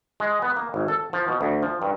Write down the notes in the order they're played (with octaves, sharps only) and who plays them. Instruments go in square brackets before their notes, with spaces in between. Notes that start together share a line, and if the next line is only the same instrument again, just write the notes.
[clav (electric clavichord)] G#3
B3
A#3
G#1
A4
F3
B2
D2
F3
G2